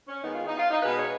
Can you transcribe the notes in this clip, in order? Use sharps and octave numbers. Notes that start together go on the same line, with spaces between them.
C#4
D#3 G#3 B3 D#4
F4
D#4
F4
D#4
B2 G#3 B3 B4
C#5